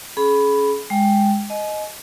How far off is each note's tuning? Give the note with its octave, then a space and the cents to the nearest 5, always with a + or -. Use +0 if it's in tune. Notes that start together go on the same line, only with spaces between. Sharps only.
C#4 +0 G#4 +35 B5 +0
G#3 -10 G5 -5
D#5 +0 G#5 +35